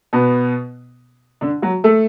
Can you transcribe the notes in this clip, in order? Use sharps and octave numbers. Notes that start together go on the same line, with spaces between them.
B2 B3
D3 D4
F#3 F#4
A3 A4